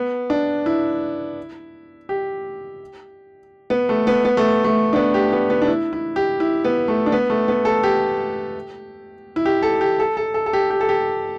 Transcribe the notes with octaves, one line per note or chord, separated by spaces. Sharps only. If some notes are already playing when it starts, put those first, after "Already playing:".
Already playing: B3
D4
E4
G4
B3
A3
B3
B3
A3
A3
D4
B3
G4
B3
B3
D4
E4
E4
G4
E4
B3
A3
D4
B3
A3
B3
A4
G4
E4
G4
A4
G4
A4
A4
A4
A4
G4
G4
A4
G4